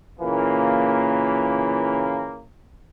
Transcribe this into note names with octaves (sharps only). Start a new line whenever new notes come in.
A#2 C#3 E3 A#3